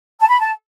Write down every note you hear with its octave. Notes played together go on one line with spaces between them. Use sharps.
A5
B5
A5